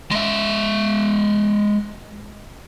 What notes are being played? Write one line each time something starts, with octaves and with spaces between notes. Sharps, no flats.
G#3 E5